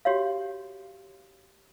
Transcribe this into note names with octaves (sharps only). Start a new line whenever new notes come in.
F#4 G4 C#5 F5